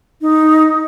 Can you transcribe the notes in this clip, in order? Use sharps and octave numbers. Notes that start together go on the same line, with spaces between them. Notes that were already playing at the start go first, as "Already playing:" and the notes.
D#4